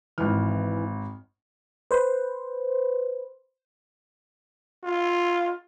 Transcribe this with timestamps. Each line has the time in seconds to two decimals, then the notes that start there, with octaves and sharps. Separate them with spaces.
0.18 G#1 E3 F6
1.91 B4 C5
4.84 F4